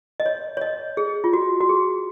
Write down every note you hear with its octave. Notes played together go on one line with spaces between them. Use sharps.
D#5
C#5
C#5
D#5
G#4
F4
F#4
F#4
G#4